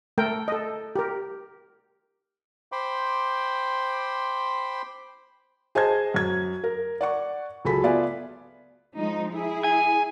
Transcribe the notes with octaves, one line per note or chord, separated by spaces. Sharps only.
A3 A4 A#4 G5
A4 D#5
G4 A#4
C5 G5 B5 C6 D6
G#4 C5 D#5 A5 G#6
F#2 G#6
A#4
D5 F#5 C#6
C#2 F#3 G#4 A4 B5 B6
B3 F4 D5 E5 G#5
F3 G#3 D#4
E4 G#4
G#5